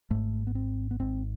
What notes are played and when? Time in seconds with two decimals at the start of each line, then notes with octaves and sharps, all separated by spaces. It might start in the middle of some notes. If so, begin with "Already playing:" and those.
0.11 G#1 G#2 A3
0.47 B3
0.55 C4
0.91 B3
0.99 G#1 G#2 C4